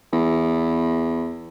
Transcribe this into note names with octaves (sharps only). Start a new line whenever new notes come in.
E2